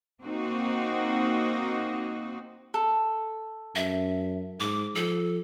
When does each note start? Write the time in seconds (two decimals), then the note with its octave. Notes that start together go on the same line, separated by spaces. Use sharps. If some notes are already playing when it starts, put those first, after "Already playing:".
0.22 A#3 C4 D#4 F#4
2.74 A4
3.76 F#2 E5
4.60 G#2 D6
4.95 F3 A4